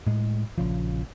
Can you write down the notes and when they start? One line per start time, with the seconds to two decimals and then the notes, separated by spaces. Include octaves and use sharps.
0.07 A2 G#3
0.58 A#1 C#3 F3